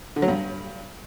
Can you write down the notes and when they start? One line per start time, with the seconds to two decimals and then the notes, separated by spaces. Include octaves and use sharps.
0.16 D3
0.22 F#3
0.28 G2